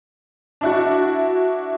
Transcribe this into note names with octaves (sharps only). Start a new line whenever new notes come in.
D4 E4 F#4